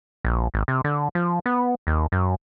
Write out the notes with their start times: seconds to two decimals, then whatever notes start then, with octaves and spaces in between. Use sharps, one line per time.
0.25 A#1
0.54 G#1
0.68 C3
0.84 D3
1.15 F3
1.46 B3
1.87 D#2
2.12 F#2